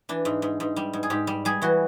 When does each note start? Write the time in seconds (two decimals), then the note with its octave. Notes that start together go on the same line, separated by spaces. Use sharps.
0.09 E3 D4
0.25 G#2
0.42 G#2
0.60 G#2
0.76 G3
0.93 G#2
1.03 G#4
1.10 G#2 G4
1.27 G3
1.45 G3 G#4
1.62 E3 F#4